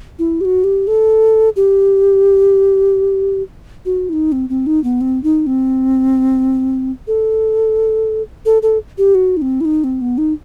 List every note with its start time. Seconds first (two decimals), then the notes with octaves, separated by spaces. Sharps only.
0.19 E4
0.41 G4
0.45 F#4
0.64 G4
0.87 A4
1.56 G4
3.85 F#4
4.09 E4
4.13 D#4
4.32 C4
4.49 C4
4.67 D#4
4.84 B3
5.01 C4
5.23 D#4
5.47 C4
7.08 A4
8.46 A4
8.62 A4
8.98 G4
9.15 F#4
9.37 D#4
9.42 C4
9.61 E4
9.65 D#4
9.84 C4
10.01 B3
10.18 D#4